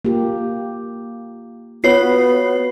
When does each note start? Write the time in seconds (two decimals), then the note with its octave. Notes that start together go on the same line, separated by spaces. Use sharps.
0.05 A#3 F4 G4
1.84 B3 F4 F#4 B4 C#5 C7